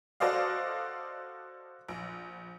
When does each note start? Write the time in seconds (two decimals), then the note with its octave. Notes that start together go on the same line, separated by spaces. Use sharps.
0.20 F#4 A4 C5 D5 D#5 F5
1.88 A#1